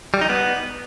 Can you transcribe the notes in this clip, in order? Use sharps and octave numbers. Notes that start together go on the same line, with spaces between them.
G3
D#4
B3